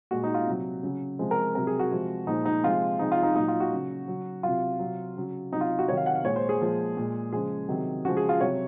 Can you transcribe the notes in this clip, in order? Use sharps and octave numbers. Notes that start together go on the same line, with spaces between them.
A#2 G#3 F#4
D#4
F4
C3 F#3
C#3 F#3
C3 F3 G#3
A#4
C3 F#3 A#4
G#4
F#4
C3 F3 G#3
A#2 F3 G#3 D#4
D#4
C3 F3 G#3 F4
C3 F3 G#3 D#4
F4
D#4
A#2 F#3 D#4
F4
F#4
C#3 F#3
C#3 F#3
C3 F#3 F4
C3 F#3
C#3 F#3
C3 F#3 D#4
F4
F#4
C3 D#3 F#3 C#5
F5
F#5
F5
A#2 G#3 C#5
C5
G#4
A#2 F3 G#3
A#2 G#3
C#3 F3 G#3 G#4
C3 D#3 F#3
C#3 F3 G#3 F#4
G#4
F4
C3 F#3 C#5